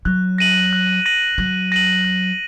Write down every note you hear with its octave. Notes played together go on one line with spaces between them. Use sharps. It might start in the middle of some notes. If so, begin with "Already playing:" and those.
F#3 F#6
A#6 D#7 F#7
F#6
A#6 D#7 F#7
F#3 F#6
A#6 D#7 F#7
F#6